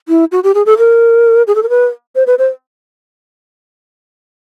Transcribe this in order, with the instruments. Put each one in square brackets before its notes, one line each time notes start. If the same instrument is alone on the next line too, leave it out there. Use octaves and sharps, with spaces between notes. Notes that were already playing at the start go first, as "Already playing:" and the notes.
[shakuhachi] E4
F#4
G4
G#4
A4
A#4
G#4
A4
A#4
B4
C5
B4
C5